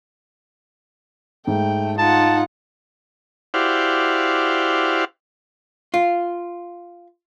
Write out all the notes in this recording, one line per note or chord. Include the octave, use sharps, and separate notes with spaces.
G#2 A3 G5
D#4 F4 F#5 A5
E4 F#4 G4 C5 D5 F5
F4